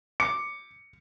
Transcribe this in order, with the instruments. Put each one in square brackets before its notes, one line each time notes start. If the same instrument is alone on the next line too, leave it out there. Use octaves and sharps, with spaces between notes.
[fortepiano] D6 [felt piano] C#7